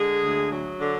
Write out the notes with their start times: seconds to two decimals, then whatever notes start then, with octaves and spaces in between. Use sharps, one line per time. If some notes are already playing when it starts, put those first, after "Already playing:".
Already playing: D3 G#3 G#4
0.23 D2
0.51 F#3
0.80 D3 D4